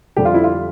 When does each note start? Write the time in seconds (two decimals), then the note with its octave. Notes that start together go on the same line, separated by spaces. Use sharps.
0.16 F2 D3 G3 G4
0.25 F4
0.34 E4
0.44 F4